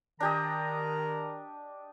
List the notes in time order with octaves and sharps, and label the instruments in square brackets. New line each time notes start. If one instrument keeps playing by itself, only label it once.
[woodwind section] D#3 A#4 A#5 [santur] D4 G4 D#5